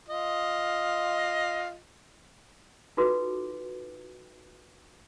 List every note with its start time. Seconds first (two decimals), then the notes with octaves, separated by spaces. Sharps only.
0.09 F4 D#5
2.97 D#4 F4 F#4 A4 B4 D6